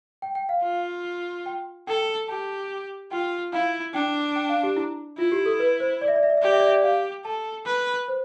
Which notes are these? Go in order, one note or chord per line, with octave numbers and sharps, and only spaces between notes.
G5
G5
F5
F4
G5
A4 G5
G4 A5
F4 G5
E4 F5
D4 G5
G5
F5
G4
E4
E4 F4
G4
A4
B4
C5
D5
E5
D5
E5
D5
E5
G4 D5
E5
D5
E5
D5
G4 F5
A4 A5
B4
C5